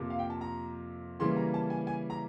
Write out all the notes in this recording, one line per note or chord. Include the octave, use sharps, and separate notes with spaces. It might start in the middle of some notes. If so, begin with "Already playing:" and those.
Already playing: F2 C3 F3 A#3
F5
G5
A5
A#5
C#3 E3 G3 A#3 C6
A#5
A5
G#5
G#5
A#5